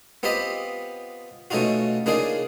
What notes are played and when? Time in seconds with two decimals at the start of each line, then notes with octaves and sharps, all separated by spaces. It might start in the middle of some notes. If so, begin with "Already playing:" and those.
0.23 B3 C4 F4 G4 D#5 B5
1.51 B2 A3 C#4 D#4 F4 F#4
2.06 C#3 A#3 D4 D#4 F4 G#4